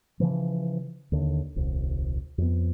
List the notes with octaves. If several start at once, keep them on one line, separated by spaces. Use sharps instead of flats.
C#3 E3 F3
D#2 D3
D#1 C2
F2 B3